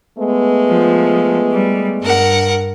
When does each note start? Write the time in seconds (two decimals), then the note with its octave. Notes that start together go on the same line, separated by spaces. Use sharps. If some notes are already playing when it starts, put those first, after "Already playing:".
0.18 G#3 A3 B3
0.68 F3
1.51 G3
2.01 G2 A#4 F#5